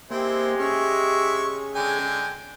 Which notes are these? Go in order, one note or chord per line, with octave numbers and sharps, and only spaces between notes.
G#3 A#3 C4 E4 G4 C5
C#4 G#4 E5 C#6 F6
D3 G#3 G5 G#5